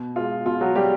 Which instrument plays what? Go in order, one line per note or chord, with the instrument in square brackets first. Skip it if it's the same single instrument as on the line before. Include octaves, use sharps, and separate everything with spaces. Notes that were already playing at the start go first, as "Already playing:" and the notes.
Already playing: [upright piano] B2
G#3 F4
B2 F4
F#3 F#4
G3 G#3 G4